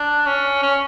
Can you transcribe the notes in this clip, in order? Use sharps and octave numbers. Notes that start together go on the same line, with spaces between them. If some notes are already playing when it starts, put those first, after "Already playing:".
Already playing: D4
C#4
C#4